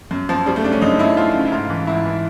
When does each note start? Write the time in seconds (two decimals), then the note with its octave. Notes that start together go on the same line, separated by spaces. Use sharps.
0.11 F#2
0.29 F#2 F3
0.46 F3 G3
0.56 A3
0.64 C#3 D4
0.72 C#4
0.82 F#2 D#4
0.99 F#2 E4
1.17 F3 F4
1.35 C#3
1.46 E4
1.52 G#2 F4
1.70 E3
1.87 G#2 E4
2.05 E3